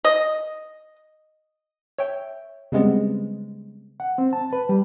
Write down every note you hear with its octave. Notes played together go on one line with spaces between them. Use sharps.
D#5
C#5 E5 G5
C#3 G3 G#3 B3 C4
F#5
C4
A5
B4
G3